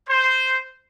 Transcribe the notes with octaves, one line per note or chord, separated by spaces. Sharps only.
C5